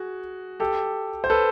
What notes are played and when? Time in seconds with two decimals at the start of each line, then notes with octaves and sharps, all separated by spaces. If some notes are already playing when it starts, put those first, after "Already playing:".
Already playing: F#4 G#4
0.60 G4 A4
1.24 C5
1.30 A4 B4